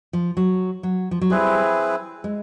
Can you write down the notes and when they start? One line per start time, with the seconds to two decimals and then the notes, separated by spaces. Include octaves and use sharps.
0.13 F3
0.37 F#3
0.83 F#3
1.11 F3
1.21 F#3
1.30 G3 C4 E4 G#4 B4
2.24 G#3